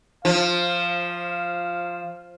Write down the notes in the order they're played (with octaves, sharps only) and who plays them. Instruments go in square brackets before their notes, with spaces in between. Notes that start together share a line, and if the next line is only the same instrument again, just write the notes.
[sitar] F3 [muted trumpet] F5